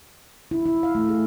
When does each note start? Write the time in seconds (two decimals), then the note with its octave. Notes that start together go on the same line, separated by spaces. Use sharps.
0.51 E4
0.66 E4
0.83 F5
0.95 A3
1.09 G#4